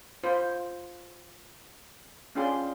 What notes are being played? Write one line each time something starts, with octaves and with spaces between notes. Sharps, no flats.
F4 C5
C#4 D4 F4 G#4 G5 C6